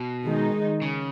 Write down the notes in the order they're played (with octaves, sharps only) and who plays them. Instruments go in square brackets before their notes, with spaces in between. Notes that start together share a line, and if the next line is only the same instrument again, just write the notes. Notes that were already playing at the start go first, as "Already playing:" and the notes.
Already playing: [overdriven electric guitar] B2
[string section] D#3 G#3 D#4
[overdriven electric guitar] C#3